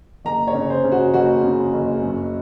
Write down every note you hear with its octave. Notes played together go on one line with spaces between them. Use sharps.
F#1 A#5
C#5
C#3
C5
C#3
F#4
F#1 F#4
C#3
F#1
F#2